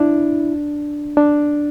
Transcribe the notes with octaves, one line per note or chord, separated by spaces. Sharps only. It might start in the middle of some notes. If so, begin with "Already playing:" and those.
Already playing: D4 E4
D4